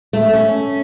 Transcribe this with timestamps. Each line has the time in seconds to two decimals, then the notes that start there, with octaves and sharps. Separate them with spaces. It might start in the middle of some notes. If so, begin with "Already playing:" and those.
0.13 A3
0.33 C#4